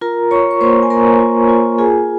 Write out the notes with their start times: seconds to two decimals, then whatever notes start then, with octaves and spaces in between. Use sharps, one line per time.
0.01 F4 A#4 A#5
0.31 F4 C#5 C#6
0.51 C#6
0.61 A#3 C5 C6
0.83 G#5
0.90 A#3 A#4 A#5
1.20 F4
1.49 F4
1.78 F4 G#4 G#5